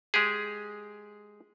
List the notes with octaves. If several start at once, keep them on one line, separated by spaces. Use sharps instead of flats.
G#3 G4 G#4